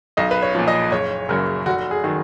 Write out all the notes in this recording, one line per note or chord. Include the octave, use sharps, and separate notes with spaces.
B1 D#5
B4
C#5
A#2 F3
D#5
F#1 C#5
F#2 C#3 A#4
F1 F#4
G#4
D#3 F#3